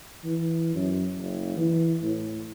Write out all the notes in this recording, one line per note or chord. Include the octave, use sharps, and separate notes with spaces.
E3
F#2
F#1
E3
A2